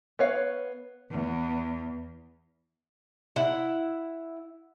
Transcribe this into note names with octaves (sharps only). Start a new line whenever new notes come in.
B3 C#5 F5
E2
E4 F#5